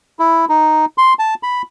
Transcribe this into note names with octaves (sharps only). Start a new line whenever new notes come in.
E4
D#4
C6
A5
B5